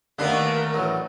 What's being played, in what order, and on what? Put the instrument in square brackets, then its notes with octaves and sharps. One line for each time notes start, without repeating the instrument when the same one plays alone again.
[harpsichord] D#2 B4 C6 [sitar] A3 B3 D4 [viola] A#4
[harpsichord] A1 F#3